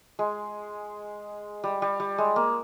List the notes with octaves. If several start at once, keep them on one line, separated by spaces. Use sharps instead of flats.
G#3
G3
G3
G3
G#3
A#3